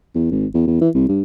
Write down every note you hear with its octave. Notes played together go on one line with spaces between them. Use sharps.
E2
G#1
E2
E2
E3
C2
G2